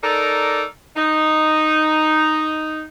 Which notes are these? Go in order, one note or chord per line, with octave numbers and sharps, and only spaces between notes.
D#4 A4 A#4 D5
D#4